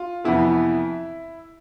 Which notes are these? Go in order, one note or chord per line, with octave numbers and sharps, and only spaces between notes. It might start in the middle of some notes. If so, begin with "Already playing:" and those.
Already playing: F4
F2 C3 E3 B3 E4